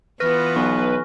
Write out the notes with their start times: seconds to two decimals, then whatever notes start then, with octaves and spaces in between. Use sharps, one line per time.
0.20 E3 B3 F4 B4 C#6 F6 A#6
0.56 B1 G#5 C#6